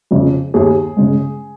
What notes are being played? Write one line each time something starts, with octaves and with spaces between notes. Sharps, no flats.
F2 C#3
D#2 G#4
C#3 G#3